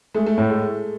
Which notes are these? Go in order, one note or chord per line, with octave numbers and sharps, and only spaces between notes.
G#3 A3
A3
A2
G#3